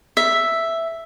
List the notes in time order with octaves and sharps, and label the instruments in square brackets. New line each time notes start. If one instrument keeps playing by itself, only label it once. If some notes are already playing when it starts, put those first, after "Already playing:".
[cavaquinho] E5